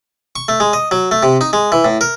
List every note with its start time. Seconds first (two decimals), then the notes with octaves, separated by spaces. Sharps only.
0.36 C#6
0.48 A3
0.60 G#3
0.73 D#5
0.91 F#3
1.11 A3
1.23 C3
1.41 D#4
1.53 G#3
1.72 E3
1.85 A2
2.01 A#4